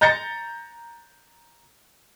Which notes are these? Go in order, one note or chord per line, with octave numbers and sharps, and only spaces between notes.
A#5 G6 A6 A#6 C#7